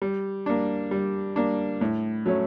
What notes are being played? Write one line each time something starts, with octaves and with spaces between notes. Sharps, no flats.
G3
A#3 D4
G3
A#3 D4
A2
F#3 A3 C#4